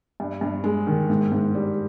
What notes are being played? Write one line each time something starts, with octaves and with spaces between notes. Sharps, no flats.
G2
G2
G#3
D#3
G#2
G#2
G3